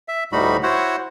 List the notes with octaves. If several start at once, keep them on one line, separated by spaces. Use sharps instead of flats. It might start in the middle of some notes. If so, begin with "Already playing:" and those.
E5
D2 A2 G3 D#4 F#4 B5
E4 F#4 C5 C#5 F#5